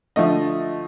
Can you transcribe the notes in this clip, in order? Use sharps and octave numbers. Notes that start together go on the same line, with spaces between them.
D3 F3 A3 D#5